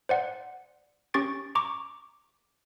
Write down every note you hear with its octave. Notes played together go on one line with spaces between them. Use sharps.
C5 D5 F#5
C#4 G4 C#6 A6 D7
A#5 C#6 D6